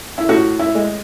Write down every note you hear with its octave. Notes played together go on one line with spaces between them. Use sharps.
E4
A2 F#4
E4
G#3